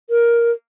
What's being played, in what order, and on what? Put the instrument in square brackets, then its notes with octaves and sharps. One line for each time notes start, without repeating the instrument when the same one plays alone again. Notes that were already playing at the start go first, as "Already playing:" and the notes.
[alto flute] A#4